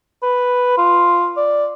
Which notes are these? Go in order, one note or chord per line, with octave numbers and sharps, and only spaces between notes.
B4
F4
D5